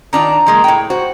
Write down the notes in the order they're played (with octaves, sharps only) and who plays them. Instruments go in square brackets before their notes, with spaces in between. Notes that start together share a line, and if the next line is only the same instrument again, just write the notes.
[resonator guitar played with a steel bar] D#3 D4 F4 [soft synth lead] A#5
[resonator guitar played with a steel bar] F3 G#3 A#3
A2 G5
[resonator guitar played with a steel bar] F#4 [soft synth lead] C5